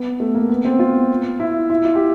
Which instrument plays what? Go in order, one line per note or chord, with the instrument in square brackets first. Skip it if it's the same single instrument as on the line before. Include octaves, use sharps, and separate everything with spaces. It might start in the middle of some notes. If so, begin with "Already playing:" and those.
Already playing: [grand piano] B3
A3
A#3
B3
C4
F4
E4
E4
F4
G4